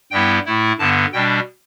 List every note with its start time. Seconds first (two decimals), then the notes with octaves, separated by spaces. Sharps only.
0.11 G2 G3 B3 E4 G5
0.46 A2 A3 E4
0.78 G2 D3 B3 A5
1.13 B2 G3 D4 G5